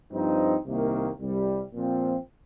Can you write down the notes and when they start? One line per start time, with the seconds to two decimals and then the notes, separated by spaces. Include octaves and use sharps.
0.12 G2 F3 C4 D#4
0.66 C2 C3 D#3 A#3
1.20 C2 C3 G3
1.73 A#2 F3 C4